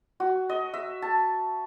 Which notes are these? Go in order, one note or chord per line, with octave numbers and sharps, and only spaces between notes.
F#4
D#5
E5
A5